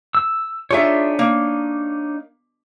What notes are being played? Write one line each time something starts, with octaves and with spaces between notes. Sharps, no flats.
E6
D4 D#4 F4 G#4 C#5 E5
A#3